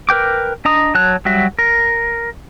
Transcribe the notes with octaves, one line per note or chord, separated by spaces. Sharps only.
A#4 B4 G5 D6
D4 D#5 A#5 D#6
F#3 C#5 A5 F#6
F#3 G3 F#4 E5
A#4